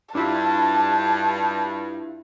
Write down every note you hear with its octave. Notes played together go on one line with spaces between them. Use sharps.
G2 D4 E4 F4 A5